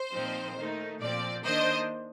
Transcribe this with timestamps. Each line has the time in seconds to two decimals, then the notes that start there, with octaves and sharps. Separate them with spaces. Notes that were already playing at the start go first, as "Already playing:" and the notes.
Already playing: C5
0.14 A#2 F3 C4 D#4
0.57 D#3 A3 D#4
1.00 A#2 F3 C4 D5
1.44 D#3 A#3 D4 C5 D#5